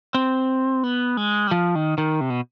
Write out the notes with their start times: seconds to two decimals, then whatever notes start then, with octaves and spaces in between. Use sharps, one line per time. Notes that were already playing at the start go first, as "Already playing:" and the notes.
0.15 C4
0.83 B3
1.17 G#3
1.47 G3
1.51 F3
1.75 D#3
1.98 D#3
2.21 C3
2.30 B2